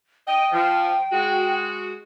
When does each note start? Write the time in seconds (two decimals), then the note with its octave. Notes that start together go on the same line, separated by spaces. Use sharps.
0.27 D#5 G5
0.52 F3
1.13 G#3 F#4